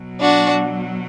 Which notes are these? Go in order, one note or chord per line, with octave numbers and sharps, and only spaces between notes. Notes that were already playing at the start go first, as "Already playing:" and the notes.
Already playing: B2 F#3
D4 F#4